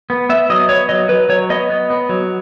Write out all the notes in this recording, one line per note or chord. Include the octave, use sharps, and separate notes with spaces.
B3
B3 E5
F#3 D#5
B3 C#5
F#3 D#5
F#3 B4
F#3 C#5
B3 D#5
B3
B3
F#3